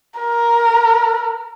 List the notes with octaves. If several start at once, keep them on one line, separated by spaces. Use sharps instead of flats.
A#4